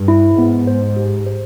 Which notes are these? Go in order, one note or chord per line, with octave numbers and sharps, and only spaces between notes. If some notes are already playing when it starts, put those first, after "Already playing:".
Already playing: G2
E4
G#2 B3
C5
G4
C5